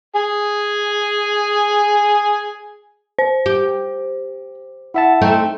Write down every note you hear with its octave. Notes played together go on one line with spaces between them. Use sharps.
G#4 G#5
C5
G4
E4 E5 F#5 A5
A3 C4 D#4 G5